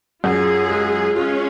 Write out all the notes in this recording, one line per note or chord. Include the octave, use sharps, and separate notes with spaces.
F#2 F4 G#4
G#3
G#3 C#4 F4